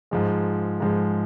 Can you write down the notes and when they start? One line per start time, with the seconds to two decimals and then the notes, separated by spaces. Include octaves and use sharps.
0.11 G#2 F3 G#3
0.80 G#2 F3 G#3